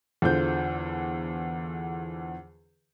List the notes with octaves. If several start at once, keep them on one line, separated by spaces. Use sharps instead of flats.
E2 D3 F4 C5 G6